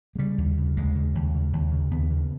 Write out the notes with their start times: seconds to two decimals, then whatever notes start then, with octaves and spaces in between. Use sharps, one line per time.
0.15 G#3
0.19 C#3 G3
0.38 D#2
0.57 C#3
0.77 D#2 G#3
0.95 C#3
1.15 D#2
1.34 C#3
1.53 D#2
1.72 C#3
1.91 D#2 B3
2.11 C#3